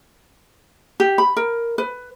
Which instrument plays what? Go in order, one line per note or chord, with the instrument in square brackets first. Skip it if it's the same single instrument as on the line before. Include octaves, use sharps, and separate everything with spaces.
[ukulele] G4
B5
A#4
B4